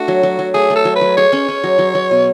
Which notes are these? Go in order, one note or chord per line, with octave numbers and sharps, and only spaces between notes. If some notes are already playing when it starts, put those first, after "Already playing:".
Already playing: A3 D4 F#4
F#3
F#3
F#3
A3 G#4
A3
A4
F#3
B4
F#3
G#4 C#5
C#4
C#4
F#3
F#3
F#3
B2